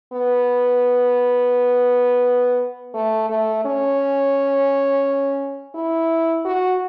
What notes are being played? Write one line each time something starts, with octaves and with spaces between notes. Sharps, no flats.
B3
A3
A3
C#4
E4
F#4